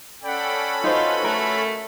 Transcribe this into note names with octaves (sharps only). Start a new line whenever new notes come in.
C#4 A4 D5 F#5 G5 B5
D#4 F4 F#4 B4 C5
A3 A#4